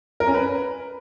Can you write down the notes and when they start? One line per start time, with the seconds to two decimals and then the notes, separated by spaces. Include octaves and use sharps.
0.20 A#4
0.27 C#4
0.34 B4